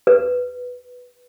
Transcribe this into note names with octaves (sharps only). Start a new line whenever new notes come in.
B4